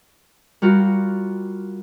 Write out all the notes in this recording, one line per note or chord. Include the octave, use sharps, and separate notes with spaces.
G3 F4 F#4 A#4